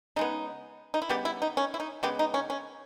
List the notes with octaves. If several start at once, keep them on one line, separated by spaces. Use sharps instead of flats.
C#3 G#3 B3 D#4
D#4
E4
C#3 G3 B3 G4
E4
D#4
C#4
E4
D#4
C#3 G#3 B3 G4
D#4
C#4
C#4